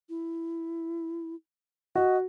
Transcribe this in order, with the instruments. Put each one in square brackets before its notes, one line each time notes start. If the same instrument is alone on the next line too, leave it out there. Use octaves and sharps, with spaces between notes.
[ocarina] E4
[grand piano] F#4 [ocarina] D#5